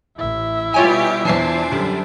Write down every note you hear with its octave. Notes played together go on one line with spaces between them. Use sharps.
A1 E4 E5
B2 G3 F4 G4 C#5 G#5
E2 E3 D4 C5 G#5 A5 C7
F#2 D3 G3